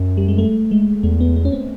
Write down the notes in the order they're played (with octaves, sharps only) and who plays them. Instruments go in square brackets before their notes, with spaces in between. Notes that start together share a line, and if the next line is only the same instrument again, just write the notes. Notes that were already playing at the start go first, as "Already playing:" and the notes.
Already playing: [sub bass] F#2
[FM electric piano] G3
G#3
A3
G#3
[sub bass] E2 [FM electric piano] A3
[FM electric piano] B3
B3
C#4
C4